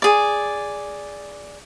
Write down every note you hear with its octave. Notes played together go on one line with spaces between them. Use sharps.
G#4 D5